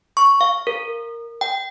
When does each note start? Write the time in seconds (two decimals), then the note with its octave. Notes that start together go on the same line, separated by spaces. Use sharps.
0.17 C#6
0.41 F5
0.67 A#4
1.41 G5